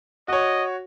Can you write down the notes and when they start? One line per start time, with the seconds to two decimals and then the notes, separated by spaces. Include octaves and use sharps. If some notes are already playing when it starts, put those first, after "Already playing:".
0.28 F#4 C#5 D#5